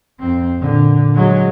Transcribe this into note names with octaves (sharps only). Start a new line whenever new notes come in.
F2 C4
A#2 D3
F#3 G#3